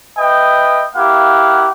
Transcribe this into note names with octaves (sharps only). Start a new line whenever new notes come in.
B4 D#5 E5 G5 D#6
A#3 E4 G4 F5 F#5